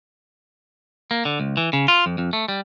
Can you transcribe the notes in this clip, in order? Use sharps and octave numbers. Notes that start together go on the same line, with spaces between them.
A#3
D3
C#2
E3
C#3
F4
F2
F2
A3
G3